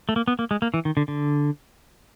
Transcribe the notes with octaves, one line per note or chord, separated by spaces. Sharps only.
A3
A#3
B3
A#3
G#3
A#3
E3
D#3
D3
D3